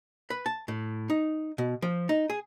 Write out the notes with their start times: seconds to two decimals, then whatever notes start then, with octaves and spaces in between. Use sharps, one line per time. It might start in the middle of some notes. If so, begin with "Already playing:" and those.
0.30 B4
0.46 A5
0.68 A2
1.10 D#4
1.58 B2
1.82 F3
2.09 D#4
2.30 G#4